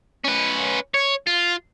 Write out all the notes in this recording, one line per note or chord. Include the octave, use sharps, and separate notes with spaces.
C#4 B4
C#5
F4